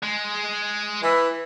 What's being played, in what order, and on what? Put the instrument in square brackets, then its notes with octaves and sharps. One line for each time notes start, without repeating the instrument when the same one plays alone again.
[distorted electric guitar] G#3
[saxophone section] E3